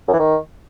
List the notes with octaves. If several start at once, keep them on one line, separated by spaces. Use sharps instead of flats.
F#2
E3
D#3